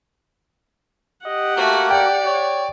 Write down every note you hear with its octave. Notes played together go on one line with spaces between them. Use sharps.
G4 D#5 F#5
A3 A#3 F#4
D5 G5
C#5